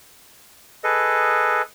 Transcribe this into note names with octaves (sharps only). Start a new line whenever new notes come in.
G#4 A4 B4 D#5